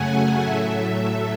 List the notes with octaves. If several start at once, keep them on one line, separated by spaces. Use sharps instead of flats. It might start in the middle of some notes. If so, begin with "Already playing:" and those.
Already playing: F#2 C#3 F#3 A3 F#5 G#5
A2 F#3 A3 E5